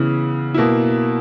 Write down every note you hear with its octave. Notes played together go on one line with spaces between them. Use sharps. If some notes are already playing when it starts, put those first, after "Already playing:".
Already playing: C#3 E3 B3 E4
B2 A#3 E4